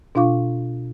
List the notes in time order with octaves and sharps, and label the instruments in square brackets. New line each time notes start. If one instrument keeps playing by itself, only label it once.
[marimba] B2 D4 F4 F5 C#6 D6